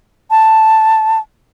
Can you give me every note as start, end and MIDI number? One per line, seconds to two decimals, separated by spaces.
0.31 1.19 81